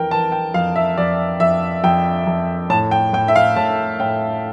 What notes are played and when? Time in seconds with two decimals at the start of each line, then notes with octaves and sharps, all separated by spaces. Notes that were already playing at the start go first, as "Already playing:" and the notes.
Already playing: F2 E3 A#4 G5
0.11 E3 A5
0.32 G5
0.54 F2 F5
0.76 E5
0.98 F2 D5
1.40 F2 E5
1.84 F2 G5
2.26 F2
2.70 A2 A5
2.91 G5
3.13 A2 G5
3.28 E5
3.36 F5
3.56 A2 A5
4.00 A2 G5